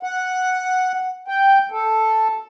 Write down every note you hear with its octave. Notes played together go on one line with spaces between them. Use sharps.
F#5
G5
A4